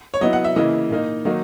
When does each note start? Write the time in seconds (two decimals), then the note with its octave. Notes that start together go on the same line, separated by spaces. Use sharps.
0.14 C#5
0.21 F#3 B3 E4 D#5
0.33 F#5
0.44 E5
0.56 C#3 E3 A#3 E4 D#5
0.90 A#2 A#3 D#4
1.25 D#3 F#3 A#3 D#4